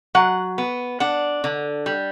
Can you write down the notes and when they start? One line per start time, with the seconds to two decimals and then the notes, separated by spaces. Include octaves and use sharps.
0.15 F#3 F#5
0.58 B3
1.00 D4 F#5
1.44 D3
1.86 G3